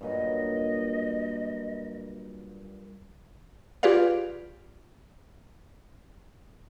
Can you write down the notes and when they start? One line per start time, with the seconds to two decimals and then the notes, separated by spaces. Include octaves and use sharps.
0.01 G2 A#2 F#3 D#5
3.83 F4 G4 G#4 B4 D5 F5